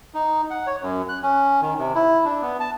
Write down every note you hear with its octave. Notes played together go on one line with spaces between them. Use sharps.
D#4
F#5
C#5
F#2
F#6
C#4
D#3
C3
E4
D4
B3
A5